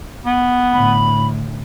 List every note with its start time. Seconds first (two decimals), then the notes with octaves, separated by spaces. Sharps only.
0.25 B3
0.72 A2 D3 B5